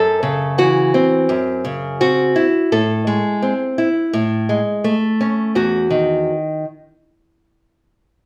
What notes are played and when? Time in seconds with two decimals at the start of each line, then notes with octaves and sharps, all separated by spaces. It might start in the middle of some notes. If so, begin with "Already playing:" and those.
Already playing: F#2 A4
0.23 C#3
0.58 E3 F#4
0.94 C4
1.29 F#2
1.65 C#3
2.01 C4 F#4
2.36 E4
2.72 A2 A4
3.07 G#3
3.42 C4
3.78 E4
4.13 A2
4.49 G#3
4.84 A3
5.21 C#4
5.55 E2 F#4
5.90 D#3